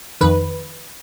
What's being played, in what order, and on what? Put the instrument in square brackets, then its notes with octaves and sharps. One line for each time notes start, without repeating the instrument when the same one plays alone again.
[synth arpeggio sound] F2 D#3 B4